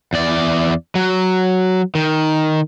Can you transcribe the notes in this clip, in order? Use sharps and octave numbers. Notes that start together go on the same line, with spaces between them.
E2 D5
F#3
D#3